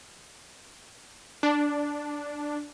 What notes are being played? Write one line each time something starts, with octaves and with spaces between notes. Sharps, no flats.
D4